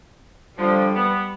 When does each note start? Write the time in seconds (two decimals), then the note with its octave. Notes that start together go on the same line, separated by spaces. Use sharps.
0.58 D3 F3 G3
0.95 B3